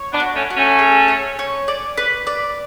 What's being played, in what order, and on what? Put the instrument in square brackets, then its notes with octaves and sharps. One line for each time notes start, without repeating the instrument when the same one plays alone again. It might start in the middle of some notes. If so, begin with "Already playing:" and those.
Already playing: [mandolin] C#5
[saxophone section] B3 D4
[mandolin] F#4
[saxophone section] A3 C#4
[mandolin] F#4
[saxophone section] A3 C#4
[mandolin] G#4
C#5
C#5
D5
B4
D5